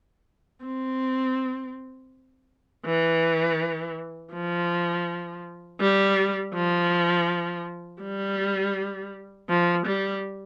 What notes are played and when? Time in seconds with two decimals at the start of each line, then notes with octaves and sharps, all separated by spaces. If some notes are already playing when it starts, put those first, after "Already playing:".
0.65 C4
2.85 E3
4.33 F3
5.81 G3
6.54 F3
8.02 G3
9.49 F3
9.86 G3